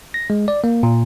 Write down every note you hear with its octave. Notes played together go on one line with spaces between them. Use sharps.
A#6
G#3
D5
A#3
A#2